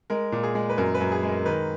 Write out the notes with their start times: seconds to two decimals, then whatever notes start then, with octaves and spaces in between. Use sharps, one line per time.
0.10 G#3 A#4
0.32 A#2
0.43 G#4
0.55 G#3
0.70 B4
0.78 F#2 A#4
0.95 B4
1.01 F#2
1.12 G#4
1.23 G#3
1.28 A#4
1.46 D#3 B4